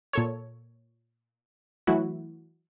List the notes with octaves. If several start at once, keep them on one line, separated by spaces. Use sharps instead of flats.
A#2 A4 C#5
E3 F#3 A3 E4 F#4